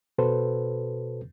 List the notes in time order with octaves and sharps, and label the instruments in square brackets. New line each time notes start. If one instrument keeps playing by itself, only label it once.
[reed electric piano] B2 F#4 A4 B4 C5